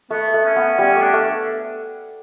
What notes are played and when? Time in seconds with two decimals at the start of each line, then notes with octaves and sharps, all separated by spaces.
0.10 A3 B3
0.34 A3
0.45 C#4
0.56 B3
0.78 G3 C#4
0.96 A3
1.01 D4
1.13 A3